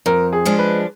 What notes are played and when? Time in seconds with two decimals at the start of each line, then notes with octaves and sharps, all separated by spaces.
0.06 F2 A#4
0.32 G#4
0.45 F3 G#3 D4
0.59 B4